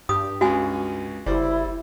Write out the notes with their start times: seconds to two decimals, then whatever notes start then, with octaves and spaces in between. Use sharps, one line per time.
0.09 G2 G4 D#6
0.41 C#2 C#3 F#4 G#5
1.26 F#1 G3 E4 C5 D5